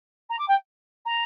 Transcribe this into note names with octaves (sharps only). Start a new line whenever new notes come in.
A#5
D6
G5
A#5